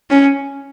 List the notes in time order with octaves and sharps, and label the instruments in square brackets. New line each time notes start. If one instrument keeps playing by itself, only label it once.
[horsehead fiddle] C#4